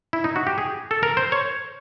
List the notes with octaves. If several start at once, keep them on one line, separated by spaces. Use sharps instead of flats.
E4
D#4
F#4
G4
G#4
A4
A#4
C5
C#5